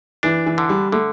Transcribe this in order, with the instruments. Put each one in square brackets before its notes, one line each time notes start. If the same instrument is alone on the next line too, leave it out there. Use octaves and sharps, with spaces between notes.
[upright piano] E3 [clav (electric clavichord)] D4
[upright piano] E3
[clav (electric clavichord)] D3
[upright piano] G3
[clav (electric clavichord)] D3 [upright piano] A3